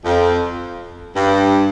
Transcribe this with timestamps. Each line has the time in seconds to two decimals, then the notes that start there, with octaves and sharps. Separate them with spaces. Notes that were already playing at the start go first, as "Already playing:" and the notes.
0.05 F2
1.14 G2